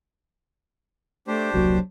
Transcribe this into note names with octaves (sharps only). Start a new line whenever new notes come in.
A3 D4 G4 C5
E1 C2 F#3 A#3 F#4